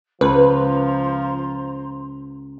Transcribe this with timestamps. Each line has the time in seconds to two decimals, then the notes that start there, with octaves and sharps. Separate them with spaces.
0.21 C#2 F3 B4 C5 A#5 C6